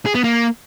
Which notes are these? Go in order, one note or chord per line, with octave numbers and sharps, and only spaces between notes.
G#4
B3
A#3